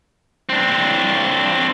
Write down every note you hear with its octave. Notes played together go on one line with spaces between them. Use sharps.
C4 D4